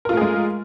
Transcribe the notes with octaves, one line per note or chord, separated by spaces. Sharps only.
G#3 A3 F4 G#4 A#4